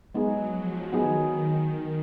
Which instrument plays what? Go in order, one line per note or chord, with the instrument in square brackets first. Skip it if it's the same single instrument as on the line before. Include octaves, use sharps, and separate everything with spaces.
[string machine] F#3 [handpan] G#3 B3 D#4 G#4
[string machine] F3
[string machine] D#3 [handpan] F#3 B3 D#4 G#4